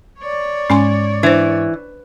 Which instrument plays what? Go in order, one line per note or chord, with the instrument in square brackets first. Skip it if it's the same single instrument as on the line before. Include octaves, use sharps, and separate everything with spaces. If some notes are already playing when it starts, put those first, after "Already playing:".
[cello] C#5 D5
[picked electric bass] G#2 [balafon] C#4 G#5 C6
[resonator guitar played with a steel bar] E3 [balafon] D4 C5